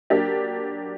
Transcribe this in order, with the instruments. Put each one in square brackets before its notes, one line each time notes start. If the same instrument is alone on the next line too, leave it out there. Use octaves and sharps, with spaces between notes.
[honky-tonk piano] F#3 A#3 D4 G4